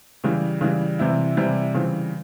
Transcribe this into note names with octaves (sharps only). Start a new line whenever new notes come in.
C#3 E3 G3
C#3 E3 G3
C3 E3 G3 C4 E4
C3 E3 G3 C4 E4
C#3 E3 G3 C4 F4